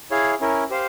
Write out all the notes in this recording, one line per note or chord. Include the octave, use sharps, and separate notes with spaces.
E4 G#4 C#5 F5
C#4 E4 A#4
G4 C5 F5